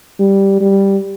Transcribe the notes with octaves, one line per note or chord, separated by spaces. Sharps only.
G3
G3